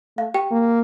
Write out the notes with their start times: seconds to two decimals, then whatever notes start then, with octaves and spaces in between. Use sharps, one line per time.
0.17 A3 F5
0.34 G4 G5
0.51 A#3